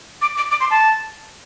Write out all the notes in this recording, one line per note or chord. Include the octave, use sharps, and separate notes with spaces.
D6
D6
D6
C6
A5